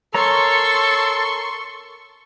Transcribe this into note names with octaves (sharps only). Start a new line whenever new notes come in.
A4 A#4 C#5 A#5 C6 C#6